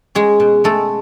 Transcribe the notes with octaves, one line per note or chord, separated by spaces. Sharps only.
G#3 C#4 G#4
B2
G#3 A3 A4